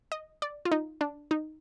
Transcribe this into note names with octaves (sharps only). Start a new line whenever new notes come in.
D#5
D5
F4
D#4
D4
D#4